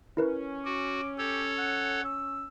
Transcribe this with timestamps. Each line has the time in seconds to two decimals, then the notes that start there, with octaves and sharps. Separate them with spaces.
0.17 C#4 E4 A#4 B4
0.65 F#4 D6
1.18 G4 A4 C#5
1.58 F#5
2.05 E6